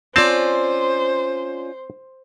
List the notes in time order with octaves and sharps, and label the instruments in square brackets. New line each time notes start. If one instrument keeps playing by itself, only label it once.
[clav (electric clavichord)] C4 A5 [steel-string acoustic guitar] C#4 F4 D5 [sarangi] C5